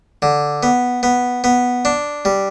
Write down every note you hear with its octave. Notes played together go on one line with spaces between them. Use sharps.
D3
B3
B3
B3
D4
G3